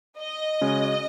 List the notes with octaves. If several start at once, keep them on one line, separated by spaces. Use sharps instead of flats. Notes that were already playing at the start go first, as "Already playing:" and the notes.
D#5
C#3 G#3 C#4 F#4